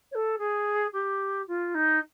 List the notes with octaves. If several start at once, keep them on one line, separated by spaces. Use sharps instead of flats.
C#5
A4
G#4
G4
F4
D#4